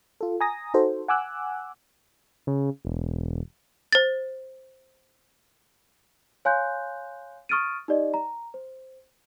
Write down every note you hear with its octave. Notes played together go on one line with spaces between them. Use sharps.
F4 A4
G#5 A#5 D#6 A#6
D#4 F#4 A4 C5
F#5 G#5 D6 E6 F#6
C#3
E1
C5 A6
C#5 F5 G#5 C6 F#6 G6
C#6 D#6 F6 A6 D7 D#7
D#4 G4 D5 D#5
A#5
C5